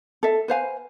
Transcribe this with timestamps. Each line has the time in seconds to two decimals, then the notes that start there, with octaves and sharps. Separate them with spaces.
0.23 A4 E5
0.48 B4 C5 F5 G#5